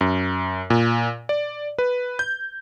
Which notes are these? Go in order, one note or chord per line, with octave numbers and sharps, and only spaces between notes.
F#2
A#2
D5
B4
G6